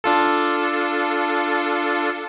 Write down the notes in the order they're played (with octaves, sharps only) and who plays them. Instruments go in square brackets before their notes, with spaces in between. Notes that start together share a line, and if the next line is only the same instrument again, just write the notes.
[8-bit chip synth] D4 F4 A4